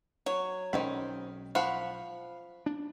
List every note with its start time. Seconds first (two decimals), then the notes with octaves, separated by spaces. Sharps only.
0.26 F#3 C#5
0.73 B1 D#3 G#3 C4 C#4 B5
1.55 F3 F5 F#5 B5 C#6
2.66 D4